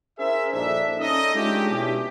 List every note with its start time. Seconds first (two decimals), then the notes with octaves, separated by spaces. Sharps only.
0.18 C#4 E4 G#4 A#4 C5 E5
0.53 A#1 G2 D4 D#4 A4 E5
1.00 C#4 D#4 A4 D#5
1.35 G#3 A3 C#4 D4 F4 G4
1.69 B2 C#4 D4 E4 G4